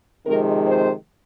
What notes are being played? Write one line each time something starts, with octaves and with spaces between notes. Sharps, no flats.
F2 C3 D#3 G#3 A#4
C5